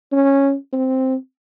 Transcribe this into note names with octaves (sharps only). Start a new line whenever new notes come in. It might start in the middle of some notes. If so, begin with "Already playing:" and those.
C#4
C4